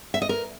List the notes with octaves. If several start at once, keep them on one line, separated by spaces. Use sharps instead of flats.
E5
D#5
A#4